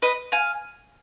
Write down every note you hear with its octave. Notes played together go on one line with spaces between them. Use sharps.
B4 D#5
F5 G#5